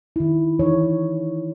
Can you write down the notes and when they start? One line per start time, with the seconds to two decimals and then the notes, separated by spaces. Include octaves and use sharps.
0.16 D#3 E4
0.59 E3 D#4 C#5